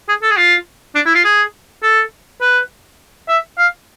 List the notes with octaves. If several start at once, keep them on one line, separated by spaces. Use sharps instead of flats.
G#4
A4
G#4
F4
D4
E4
F4
G#4
A4
B4
E5
F5